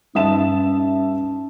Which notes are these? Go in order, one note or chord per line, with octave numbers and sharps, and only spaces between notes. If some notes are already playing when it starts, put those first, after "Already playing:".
G2 C#4 D#4 E5 A5 E7